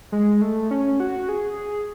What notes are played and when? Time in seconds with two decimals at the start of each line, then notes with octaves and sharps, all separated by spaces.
0.12 G#3
0.41 A3
0.71 C#4
1.00 F#4
1.29 G#4